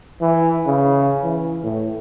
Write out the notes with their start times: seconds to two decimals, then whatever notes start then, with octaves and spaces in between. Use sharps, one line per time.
0.21 E3
0.67 C#3
1.23 E3
1.64 A2